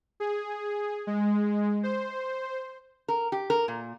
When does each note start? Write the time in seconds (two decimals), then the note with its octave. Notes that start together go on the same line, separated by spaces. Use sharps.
0.20 G#4
1.07 G#3
1.83 C5
3.08 A#4
3.32 G4
3.50 A#4
3.68 A#2